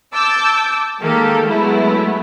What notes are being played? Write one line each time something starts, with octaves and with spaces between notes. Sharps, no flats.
A5 D6 E6 G6
D#3 G#3 A#3 G4 A4
F#3 G#3 A3 B3 E4